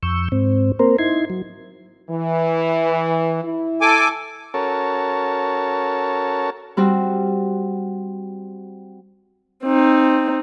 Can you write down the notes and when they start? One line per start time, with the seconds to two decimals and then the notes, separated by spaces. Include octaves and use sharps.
0.03 F2 C#6 E6 G6
0.32 G#2 C4
0.79 A#3 C4 A#4 C5
0.99 D#4 E4 C6 G#6
1.30 F#3
2.09 E3
3.43 E4
3.81 A4 G#5 D6
4.54 C#4 F#4 A4 A#4 C#5 A5
6.77 G3 C4 F#4
9.64 C4 D#4